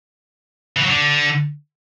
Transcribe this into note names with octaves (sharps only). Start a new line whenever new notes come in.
E3
F#3
D3